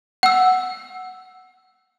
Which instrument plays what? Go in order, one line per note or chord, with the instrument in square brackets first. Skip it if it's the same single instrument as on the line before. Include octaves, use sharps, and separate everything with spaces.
[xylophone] F#5 E6